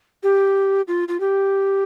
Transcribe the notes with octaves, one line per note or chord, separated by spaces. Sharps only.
G4
F4
F4
G4